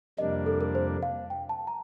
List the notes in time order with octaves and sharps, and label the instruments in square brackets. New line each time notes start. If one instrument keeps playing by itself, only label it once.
[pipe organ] F2 C3 G3 A#3 D4 [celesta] D#5
[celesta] A4
A#4
C5
F5
G5
A5
A#5